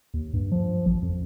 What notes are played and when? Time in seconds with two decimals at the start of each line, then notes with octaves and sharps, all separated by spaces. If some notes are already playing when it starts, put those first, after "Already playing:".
0.14 D#2
0.34 G2
0.52 F3
0.86 A1
1.03 F2